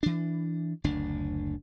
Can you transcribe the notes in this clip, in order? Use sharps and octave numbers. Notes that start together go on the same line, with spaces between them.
E3 D4
F#1 D2 D4